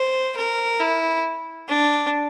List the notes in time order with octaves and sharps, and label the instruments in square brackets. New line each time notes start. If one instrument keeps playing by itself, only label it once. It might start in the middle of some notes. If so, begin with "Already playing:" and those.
Already playing: [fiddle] C5
A#4
E4
D4